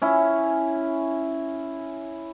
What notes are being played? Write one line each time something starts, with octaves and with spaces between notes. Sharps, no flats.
C#4 E4